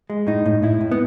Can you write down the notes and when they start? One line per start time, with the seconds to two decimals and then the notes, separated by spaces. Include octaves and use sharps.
0.10 G#3
0.27 A2 D#4
0.46 A2
0.63 A2 E4
0.81 A2
0.92 B3